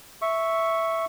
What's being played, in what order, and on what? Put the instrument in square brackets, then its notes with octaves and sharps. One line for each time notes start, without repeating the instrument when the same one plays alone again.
[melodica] E5 C#6